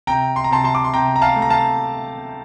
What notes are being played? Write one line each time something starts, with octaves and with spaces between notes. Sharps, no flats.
C3 G5 A#5
C6
A#5
C3 A5 C6
A5 C6
D6
C6
C3 G5 A#5
A#5
F5 A5
A3
A#5
F5 A5